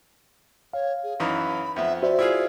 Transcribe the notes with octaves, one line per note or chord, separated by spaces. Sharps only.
C#5 F5
G#4
F#2 E3 D#4 B5
F2 B3 E5
F#4 C5 D5 E5
E4 F4 G#4